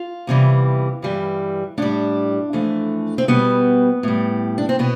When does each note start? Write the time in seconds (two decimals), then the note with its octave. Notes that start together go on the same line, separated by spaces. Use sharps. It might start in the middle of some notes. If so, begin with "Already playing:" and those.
Already playing: F4
0.27 E2 C3 E3 G3
1.02 G2 E3 G3
1.78 A2 G3 D4
2.53 F2 E3 A3
3.18 C4
3.28 B2 G3 B3
4.03 A2 G3
4.58 D4
4.69 C4
4.79 B2 B3